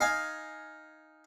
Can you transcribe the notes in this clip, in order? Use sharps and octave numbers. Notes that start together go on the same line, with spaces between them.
D#4 F5 G#5